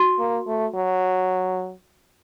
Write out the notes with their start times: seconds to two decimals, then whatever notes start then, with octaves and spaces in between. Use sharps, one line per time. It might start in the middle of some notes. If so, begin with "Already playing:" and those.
Already playing: F#4
0.19 A#3
0.47 A3
0.75 F#3